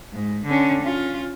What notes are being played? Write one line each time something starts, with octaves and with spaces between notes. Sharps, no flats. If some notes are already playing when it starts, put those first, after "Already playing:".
G#2
D3 C#4
C#4 F4